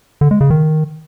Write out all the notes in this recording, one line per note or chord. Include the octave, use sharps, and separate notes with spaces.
D3
G#3
C#3
D#3